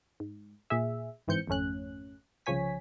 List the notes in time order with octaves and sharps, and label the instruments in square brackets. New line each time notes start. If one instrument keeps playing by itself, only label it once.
[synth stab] G#2
A#2 G#4 E5
G1 G#2 E3 C4 G6 C#7
G#1 F2 A3 C#4 F#6
C2 C#3 F3 C#5 G#5 B6